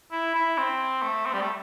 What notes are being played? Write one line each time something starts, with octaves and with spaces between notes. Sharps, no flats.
E4
E4
C4
A3
C4
G3
A3